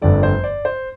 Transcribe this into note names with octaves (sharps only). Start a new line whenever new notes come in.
G1 F2 D3 A3 D5
C5
D5
C5